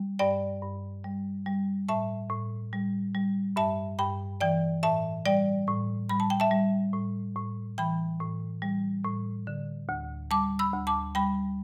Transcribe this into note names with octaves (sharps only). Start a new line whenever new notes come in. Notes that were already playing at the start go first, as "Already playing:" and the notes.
Already playing: G3
G2 D5 G5
G2
G3
G3
A2 E5 A5
A2
G3
G3
G2 E5 A5
G2 G5 B5
E3 D5 G5
A2 E5 A5
G3 D5 G5
A2
G3 B5
A5
G5
E5 A5
G3
A2
A2
E3 G5 B5
A2
G3
A2
D3
D2
G3 A5 D6
B5 E6
D2
A5 D6
G3 G5 B5